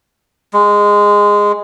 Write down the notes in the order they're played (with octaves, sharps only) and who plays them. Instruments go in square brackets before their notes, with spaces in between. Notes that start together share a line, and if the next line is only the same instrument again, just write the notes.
[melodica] G#3